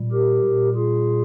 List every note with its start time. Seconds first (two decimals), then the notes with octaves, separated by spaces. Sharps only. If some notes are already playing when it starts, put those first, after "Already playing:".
Already playing: A#2 G3
0.12 G4 A#4
0.44 A#2 G3
0.75 F4 G#4